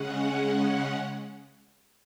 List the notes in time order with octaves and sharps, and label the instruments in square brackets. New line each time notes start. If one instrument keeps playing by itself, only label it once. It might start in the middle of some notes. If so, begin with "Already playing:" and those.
Already playing: [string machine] C#3 G#3 C#4 F#5